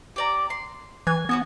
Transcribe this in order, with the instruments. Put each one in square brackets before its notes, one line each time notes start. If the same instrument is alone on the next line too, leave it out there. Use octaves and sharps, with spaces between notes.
[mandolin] G4 D5 A#5
C6
[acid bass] E3 [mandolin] G#5
[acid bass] B3 [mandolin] C#4 F#4 G#5